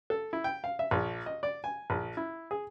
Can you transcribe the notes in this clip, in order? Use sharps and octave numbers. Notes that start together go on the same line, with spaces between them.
A4
E4
G5
F5
E5
A#1
D#5
D5
G#5
A#1
E4
G#4